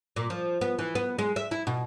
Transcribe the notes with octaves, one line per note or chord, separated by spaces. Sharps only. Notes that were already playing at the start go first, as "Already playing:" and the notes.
A#2
F3
B3
E3
B3
G#3
E5
E4
B2